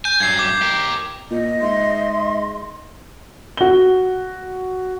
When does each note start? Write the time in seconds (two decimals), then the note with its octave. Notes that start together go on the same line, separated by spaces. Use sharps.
0.05 G#5 G6
0.20 G2 F#3 G#6 C7
0.39 D6
0.62 G4 A#4
1.31 A#2 D#5
1.61 G#2 E5 C6
3.57 F#4 G7